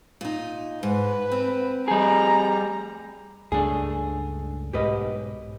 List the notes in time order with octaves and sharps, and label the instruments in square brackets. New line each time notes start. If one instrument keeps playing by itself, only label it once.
[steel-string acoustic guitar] A#2 D#4
[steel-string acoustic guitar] G#2 [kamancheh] B4
[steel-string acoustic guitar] C4
[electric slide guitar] G3 G#4 [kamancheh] A#5
[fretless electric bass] C#2 G2 A3 [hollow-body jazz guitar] D4 G#4
[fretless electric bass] B1 G#2 [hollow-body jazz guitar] G4 B4 D#5